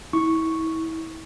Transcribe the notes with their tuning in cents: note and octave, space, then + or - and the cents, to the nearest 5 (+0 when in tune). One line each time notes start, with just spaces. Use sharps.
E4 -35 C#6 +0